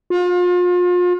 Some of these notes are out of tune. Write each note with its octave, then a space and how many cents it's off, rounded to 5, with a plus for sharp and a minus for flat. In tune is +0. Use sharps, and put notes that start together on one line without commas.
F4 +35